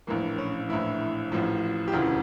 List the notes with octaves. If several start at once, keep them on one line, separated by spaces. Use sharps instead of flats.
A#1 A2 E3 A#3
C#4
A#1 A2 E3 E4
A1 A2 F3
G4
E1 D2 C#3 E3 F4